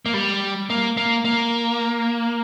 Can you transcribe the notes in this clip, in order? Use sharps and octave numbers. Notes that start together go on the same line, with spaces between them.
A#3
G3
A#3
A#3
A#3